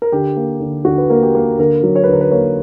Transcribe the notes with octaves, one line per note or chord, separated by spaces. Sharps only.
A#4
D3 G4
A#3
D3
D3 F#4
B4
A#3 A#4
G4
A#3
D3 A#4
F#3
C#5
B4
D3
A#4
B4
A#3 C#5